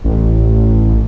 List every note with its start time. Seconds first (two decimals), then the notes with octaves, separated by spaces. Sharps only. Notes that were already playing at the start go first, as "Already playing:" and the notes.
0.04 A1